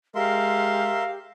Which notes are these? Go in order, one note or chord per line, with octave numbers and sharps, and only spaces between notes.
G#3 G4 A#4 E5 F5 C6